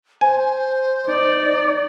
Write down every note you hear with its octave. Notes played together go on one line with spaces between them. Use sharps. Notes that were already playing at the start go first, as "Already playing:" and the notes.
C5 G#5
D#4 D5